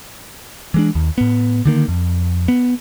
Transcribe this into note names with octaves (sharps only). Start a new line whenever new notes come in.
E3 G#3 D4
D#2
A2 B3
D3 D#3 A#3
F2
B3